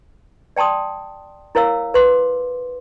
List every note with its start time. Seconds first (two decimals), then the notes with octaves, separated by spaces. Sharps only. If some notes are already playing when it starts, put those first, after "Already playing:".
0.56 D5 G5 A5 C6 D#6
1.55 E4 A#4 C#5 F5 E6
1.94 B4 C6 D6